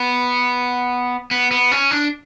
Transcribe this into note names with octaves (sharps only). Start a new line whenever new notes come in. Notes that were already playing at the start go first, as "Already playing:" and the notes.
Already playing: B3
B3
B3
C#4
D4